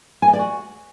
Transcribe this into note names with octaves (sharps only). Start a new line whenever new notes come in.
G#5
D#5
D5
F#4